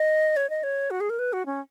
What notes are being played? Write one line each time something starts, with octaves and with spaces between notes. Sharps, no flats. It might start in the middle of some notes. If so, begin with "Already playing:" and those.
Already playing: D#5
C#5
D#5
C#5
F#4
G#4
A#4
B4
F#4
C#4